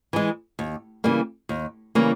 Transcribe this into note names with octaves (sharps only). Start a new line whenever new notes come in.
E3 G#3
D#2
C#3 E3 G3 A#3
D#2
C#3 E3 G3 A#3